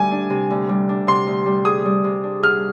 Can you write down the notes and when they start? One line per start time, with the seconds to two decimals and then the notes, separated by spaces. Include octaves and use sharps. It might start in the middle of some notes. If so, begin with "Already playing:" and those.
Already playing: D2 G3 G#5
0.11 D4
0.30 C3
0.50 D2
0.69 G3
0.89 D4
1.07 C3 C6
1.27 D2
1.46 G3
1.65 G#4 D#6
1.85 G3
2.04 C3
2.23 D4
2.43 G#4 F6